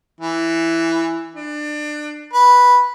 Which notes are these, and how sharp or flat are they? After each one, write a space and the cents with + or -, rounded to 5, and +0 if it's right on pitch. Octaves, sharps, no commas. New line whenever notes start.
E3 +5
D4 +25
B4 -5